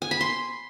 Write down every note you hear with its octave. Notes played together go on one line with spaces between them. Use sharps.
G#5
B5
C6